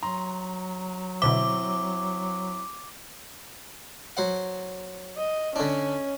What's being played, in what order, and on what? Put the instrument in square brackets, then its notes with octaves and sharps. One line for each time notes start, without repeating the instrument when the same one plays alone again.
[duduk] F#3 [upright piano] A#5 C6
[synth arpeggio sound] B2 D3 E5 [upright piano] C4 E4 [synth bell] D6
[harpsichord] F#3 C5 F#5
[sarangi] D#5
[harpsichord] D3 D4 [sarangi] C#4